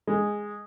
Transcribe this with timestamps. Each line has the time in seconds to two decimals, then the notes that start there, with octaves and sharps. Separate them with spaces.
0.07 G#3